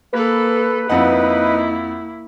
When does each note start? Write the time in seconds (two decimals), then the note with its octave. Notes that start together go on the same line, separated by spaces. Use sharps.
0.13 A#3 A4 B4
0.90 F2 A#3 D#4 E4 F#5